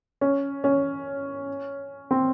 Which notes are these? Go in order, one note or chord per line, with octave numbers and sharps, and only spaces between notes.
C#4
C#4
C4